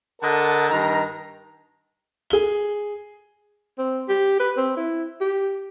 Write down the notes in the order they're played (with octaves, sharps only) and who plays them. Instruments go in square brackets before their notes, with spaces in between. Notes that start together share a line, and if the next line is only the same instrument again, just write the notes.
[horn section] D3 A#4 D#5 F#5 A5
G2 D#3 A#5
[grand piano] G#4 G7
[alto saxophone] C4
G4
B4
C4
E4
G4